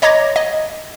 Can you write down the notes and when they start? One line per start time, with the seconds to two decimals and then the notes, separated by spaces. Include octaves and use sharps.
0.02 C#5 D#5 A#5 D6 G#6 A#6
0.36 D#5